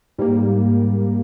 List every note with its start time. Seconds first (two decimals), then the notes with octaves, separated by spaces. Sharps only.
0.18 G#2 G3 A#3